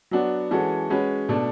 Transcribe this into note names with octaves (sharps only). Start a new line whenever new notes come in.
F#3 B3 D4 F#4
E3 G#3 C#4 F#4 A4
G#3 C#4 F#4 B4
B2 A3 D4 A4